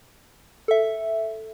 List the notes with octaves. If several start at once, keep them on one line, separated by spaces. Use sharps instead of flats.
A4 E5